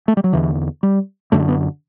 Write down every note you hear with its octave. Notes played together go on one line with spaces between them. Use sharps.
A3
G3
F#3
E2 D3 E3
G3
F#2 D3 A3
B3